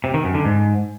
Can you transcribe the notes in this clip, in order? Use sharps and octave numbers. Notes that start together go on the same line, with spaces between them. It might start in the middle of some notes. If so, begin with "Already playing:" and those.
C3
D#3
F#2
D3
G#2